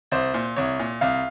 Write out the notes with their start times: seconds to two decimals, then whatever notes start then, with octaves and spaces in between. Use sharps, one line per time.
0.12 C2 C5
0.34 A#2
0.56 C2 C#5
0.79 A#2
1.01 C2 F5